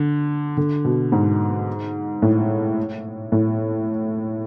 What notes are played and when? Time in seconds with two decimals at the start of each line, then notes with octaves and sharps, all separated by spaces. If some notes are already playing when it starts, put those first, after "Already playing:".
Already playing: D3
0.57 D3
0.85 B2
1.12 G#2
2.22 A2
3.32 A2